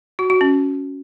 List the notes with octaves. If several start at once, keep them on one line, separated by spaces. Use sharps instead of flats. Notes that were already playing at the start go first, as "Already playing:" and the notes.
F#4
F#4
C#4